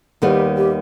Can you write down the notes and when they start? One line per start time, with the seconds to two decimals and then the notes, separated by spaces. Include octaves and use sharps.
0.22 D#2 D#3 G3 B3 G4 A4
0.57 G4